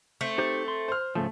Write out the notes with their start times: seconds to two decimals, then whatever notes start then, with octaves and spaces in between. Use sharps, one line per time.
0.21 A3 C4
0.38 D#4 G4 C5
0.68 C6
0.88 C5 F6
1.15 G#2 C#3 F3 A3